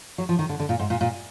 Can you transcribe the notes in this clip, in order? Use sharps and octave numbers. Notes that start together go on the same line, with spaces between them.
F#3
F3
D#3
D3
D3
A#2
G#2
A#2
A#2